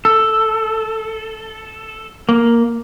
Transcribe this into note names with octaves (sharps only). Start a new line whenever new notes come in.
A4
A#3